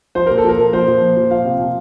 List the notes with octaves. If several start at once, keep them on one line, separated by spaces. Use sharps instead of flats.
F3 C5
A#2 A#4
A4
F3 A#4
A#2
F3 C5
A#2
F3
A#2
F3 F5
C3
F3